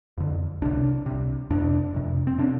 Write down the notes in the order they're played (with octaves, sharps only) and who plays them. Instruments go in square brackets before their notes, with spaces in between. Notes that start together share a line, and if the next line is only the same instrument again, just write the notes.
[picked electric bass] F2 D3
C2 C3 D4
C2 C3
F2 C3 D4
F2 C3
C4
C3 D4